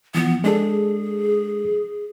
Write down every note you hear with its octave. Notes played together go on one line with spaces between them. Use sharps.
E3 F3 B3
G#3 D4 G#4 A4